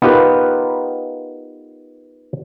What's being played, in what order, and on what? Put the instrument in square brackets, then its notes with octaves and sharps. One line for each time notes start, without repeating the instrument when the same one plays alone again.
[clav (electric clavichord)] B3 D#4 F4 G4 A#4 B4